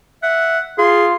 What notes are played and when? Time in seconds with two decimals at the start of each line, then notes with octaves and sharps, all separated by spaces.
0.23 E5 F#5
0.78 F4 G#4 C6